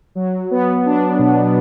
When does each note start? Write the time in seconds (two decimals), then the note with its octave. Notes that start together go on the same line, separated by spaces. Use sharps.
0.15 F#3
0.51 B3
0.86 D4
1.19 B2